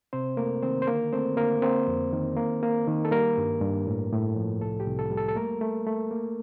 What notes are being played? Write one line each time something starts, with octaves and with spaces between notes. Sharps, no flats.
C3 C4 C5
A3 A#3 A#4
D#3 C4 C5
C5
D3 A#3 A#4
A3 C4 C5
D3 A#3 A#4
A#3 C4 C5
F2
D#3
A#3
A#3
D#3
A4
G3 A#3 A#4
G2
G2
A2
A2
F3
C2 A4
G4
C2
A4
G3
A4
A4
A3 A#3 A#4
A3
A3
A#3